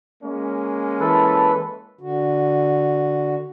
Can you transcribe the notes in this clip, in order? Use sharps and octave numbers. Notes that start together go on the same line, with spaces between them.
G#3 A#3 C#4
E3 A4 B4
D3 F#4